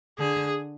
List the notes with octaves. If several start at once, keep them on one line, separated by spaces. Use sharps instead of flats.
D3 G#4